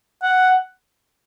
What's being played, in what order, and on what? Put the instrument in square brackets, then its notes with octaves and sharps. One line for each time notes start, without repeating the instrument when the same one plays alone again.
[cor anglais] F#5